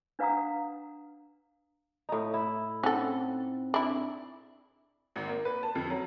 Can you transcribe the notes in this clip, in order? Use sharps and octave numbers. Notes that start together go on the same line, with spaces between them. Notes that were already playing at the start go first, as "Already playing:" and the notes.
D4 B4 F5 F#5 A#5 D#6
A2 D#4
E4
C4 C#4 D#4 A4 F#5
D4 E4
G#1
A#3
B4
A5
F2
F#3